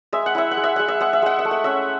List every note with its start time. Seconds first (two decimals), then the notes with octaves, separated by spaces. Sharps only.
0.13 G#3 E5
0.26 F#5
0.35 E4 E5
0.51 F#5
0.57 G#3
0.64 E5
0.76 G#3 F#5
0.88 E5
1.00 G#3 F#5
1.13 E5
1.22 G#3 F#5
1.39 E5
1.45 A3
1.51 F#5
1.64 C#4 E5